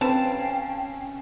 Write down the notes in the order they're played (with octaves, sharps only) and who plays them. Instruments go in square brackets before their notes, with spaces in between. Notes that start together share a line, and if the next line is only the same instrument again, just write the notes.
[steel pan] C4 B4 C5 [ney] C#4 [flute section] F5 G5 [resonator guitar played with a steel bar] A5